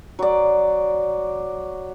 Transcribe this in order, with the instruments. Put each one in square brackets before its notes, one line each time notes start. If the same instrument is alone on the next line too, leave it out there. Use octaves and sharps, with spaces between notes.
[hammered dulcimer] F#3 D5